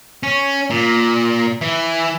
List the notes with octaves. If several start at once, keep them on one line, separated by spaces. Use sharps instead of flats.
C#4
A#2
E3